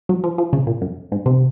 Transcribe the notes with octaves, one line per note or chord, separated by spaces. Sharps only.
F#3
F3
F3
C#3
A#2
F#2
G#2
C3